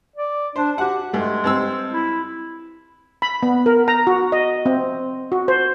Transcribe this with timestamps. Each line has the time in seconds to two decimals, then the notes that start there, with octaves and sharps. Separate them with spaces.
0.16 D5
0.56 D4 C5
0.78 F#4 G4 F#5
1.13 G2 G#3 A3
1.44 G2 C4 E6
1.92 E4
3.22 B5
3.43 B3
3.66 A#4
3.88 A#5
4.07 F#4
4.32 D#5
4.66 C4
5.32 F#4
5.48 C5